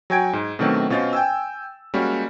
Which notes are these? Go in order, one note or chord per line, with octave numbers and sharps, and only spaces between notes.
F#3 F#4 G5 G#5 G#6 D7
G#2
B2 D#3 F#3 A3 C4 D4
B2 C#4 F4 C5 D#5 A6
G5 G#5 E6
G3 G#3 A#3 C#4 F#4